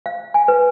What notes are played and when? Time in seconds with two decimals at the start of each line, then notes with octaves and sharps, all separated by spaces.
0.06 F5
0.34 G#5
0.48 B4